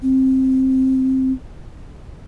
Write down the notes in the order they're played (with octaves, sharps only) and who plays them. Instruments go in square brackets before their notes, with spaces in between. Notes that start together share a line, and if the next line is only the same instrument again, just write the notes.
[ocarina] C4